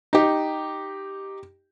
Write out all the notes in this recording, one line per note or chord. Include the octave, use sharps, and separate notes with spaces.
D#4 G4